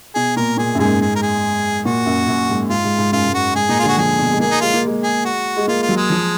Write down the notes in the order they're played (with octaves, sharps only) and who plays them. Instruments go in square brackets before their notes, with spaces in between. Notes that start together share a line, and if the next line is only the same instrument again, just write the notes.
[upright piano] B2 [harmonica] G#4
[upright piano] A#2 [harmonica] A#4
[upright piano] A#2 [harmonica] G#4
[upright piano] F#2
[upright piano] G#2 [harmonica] G#4
[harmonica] G#4
A#4
G#4
[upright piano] A#2 [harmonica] F#4
[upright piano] F#2
F#2
G#2
[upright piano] G#2 [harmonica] F4
[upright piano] G#2
G#2
[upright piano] F#2 [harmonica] F4
[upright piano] G#2
[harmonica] F#4
[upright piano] G#2 [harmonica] G#4
[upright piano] A#2 [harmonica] D#4
[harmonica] F4
[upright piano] D3 [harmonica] F#4
[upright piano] F3 [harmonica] G#4
[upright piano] B2
G#3
[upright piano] A#3 [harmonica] G#4
[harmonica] D#4
[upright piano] G#3 [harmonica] F4
[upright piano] A#3
G#3
[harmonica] G#4
F#4
[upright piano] G#3
[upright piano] A#3 [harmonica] F4
[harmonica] F4
[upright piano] F#3
[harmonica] G#3
[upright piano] F3